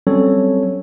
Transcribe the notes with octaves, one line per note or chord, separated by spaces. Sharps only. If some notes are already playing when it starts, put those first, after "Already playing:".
F#3 G3 C4 C#4 A4 C#5